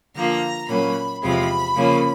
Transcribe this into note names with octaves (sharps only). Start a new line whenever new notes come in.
D3 F3 A#3 A#5
A#2 F#3 A#3 C#4 B5
E2 C3 F3 G#3 C4 B5
C#3 F3 A#3 C#4